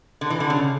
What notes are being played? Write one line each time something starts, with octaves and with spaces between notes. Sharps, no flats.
D3
E3
D3
C#3